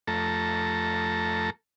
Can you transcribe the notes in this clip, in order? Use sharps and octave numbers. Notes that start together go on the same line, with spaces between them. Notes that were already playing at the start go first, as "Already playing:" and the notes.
F2 A3 A4 A#5